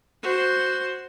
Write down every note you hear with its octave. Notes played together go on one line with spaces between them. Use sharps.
F#4 C5